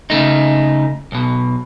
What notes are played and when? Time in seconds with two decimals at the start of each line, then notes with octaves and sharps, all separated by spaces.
0.10 C#3 A3 D#4
1.12 B1 B2